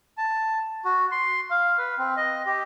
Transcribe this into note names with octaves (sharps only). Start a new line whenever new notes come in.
A5
F#4
C6
F5
B4
C4
D#5
G4